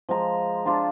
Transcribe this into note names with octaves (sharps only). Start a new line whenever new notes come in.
F3 G#3 A#5
D4 F4 C5 A5